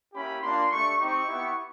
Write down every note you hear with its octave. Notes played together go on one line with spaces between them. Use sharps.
A#3 C#4 E4 G4 B5
A#3 D4 F4 C6
A3 D4 G4 C#6
C4 D#4 G4 C#6
B3 E4 G4